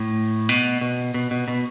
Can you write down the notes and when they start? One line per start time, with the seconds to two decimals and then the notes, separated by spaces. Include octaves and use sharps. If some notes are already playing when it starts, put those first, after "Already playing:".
Already playing: A2
0.49 B2
0.81 B2
1.14 B2
1.31 B2
1.48 B2